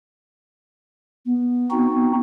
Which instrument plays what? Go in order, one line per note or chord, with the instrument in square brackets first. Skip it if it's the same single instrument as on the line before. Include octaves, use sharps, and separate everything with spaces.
[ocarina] B3
[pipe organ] C4 D#4 F#4